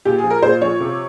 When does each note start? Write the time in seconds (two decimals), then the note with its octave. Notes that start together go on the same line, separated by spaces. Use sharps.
0.05 A#2 G4
0.18 G#4
0.24 F3
0.30 A#4
0.43 A#2 C5
0.61 F3 C#5
0.80 C3